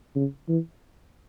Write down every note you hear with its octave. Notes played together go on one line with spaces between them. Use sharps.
C#3
E3